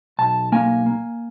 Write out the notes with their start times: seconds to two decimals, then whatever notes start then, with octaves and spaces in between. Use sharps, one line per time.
0.19 B1 A5
0.52 A#3 G#5
0.86 A#3